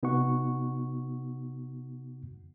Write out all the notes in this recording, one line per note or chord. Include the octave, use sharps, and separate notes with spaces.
C3 B3 D#4 F#4 F#5 C#6